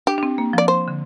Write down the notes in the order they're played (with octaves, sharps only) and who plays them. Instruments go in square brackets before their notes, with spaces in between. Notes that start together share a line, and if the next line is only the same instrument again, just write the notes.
[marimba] D4 [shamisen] G4
[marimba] D4
C4
A#3
[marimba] F3 [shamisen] D5
[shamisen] C5
[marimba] D3